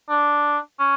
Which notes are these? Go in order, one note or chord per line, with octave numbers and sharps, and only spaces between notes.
D4
C#4